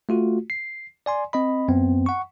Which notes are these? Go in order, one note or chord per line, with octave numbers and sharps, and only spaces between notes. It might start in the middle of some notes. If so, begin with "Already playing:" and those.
A3 F4 F#4
C7
D5 G#5 C6
C4 D#5 B5
F#2 B3 C4
F#5 C#6